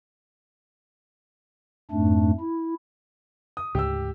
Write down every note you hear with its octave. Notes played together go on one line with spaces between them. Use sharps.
F2 G#2 A3 D4
E4
D#6
D2 G#2 C#3 G#3 G4 E6